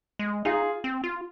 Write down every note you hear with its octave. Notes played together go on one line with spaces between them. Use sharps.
G#3
D#4 F4 G#4
C4
F4